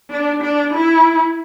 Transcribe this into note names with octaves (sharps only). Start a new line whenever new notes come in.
D4
D4
E4